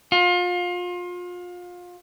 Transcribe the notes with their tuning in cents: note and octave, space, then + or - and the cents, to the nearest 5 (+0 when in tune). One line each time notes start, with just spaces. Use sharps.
F4 +30